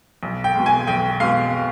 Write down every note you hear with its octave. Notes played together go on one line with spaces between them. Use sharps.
B1
G5
B2 G#3
G#5
B1 G5
B2 G#3 F5